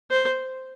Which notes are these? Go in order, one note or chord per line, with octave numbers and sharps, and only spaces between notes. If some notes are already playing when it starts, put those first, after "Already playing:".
C5